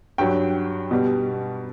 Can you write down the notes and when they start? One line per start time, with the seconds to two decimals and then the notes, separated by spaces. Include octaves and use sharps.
0.18 G2 F#3 G5
0.91 B2 G3